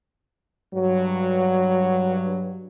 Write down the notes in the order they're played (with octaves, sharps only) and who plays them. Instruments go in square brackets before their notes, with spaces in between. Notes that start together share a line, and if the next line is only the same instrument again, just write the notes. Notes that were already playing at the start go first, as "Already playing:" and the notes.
[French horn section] G2 F#3